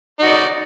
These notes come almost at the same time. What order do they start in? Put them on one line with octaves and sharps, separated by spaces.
D#4 F#4 D5